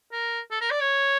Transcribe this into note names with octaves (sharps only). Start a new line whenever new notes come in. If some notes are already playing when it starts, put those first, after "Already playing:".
A#4
A4
A#4
D5
C#5